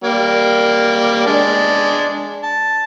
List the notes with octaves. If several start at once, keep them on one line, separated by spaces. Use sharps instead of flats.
G3 A#3
G#3 D4
A5